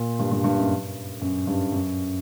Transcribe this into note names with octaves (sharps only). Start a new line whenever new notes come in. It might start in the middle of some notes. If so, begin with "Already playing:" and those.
Already playing: A#2
G2
G2
G2
F#2
F#2
G2
F#2